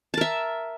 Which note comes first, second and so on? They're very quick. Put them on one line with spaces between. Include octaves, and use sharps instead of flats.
A5 A#4 E5